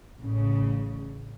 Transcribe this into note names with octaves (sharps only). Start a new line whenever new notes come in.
A1 C#3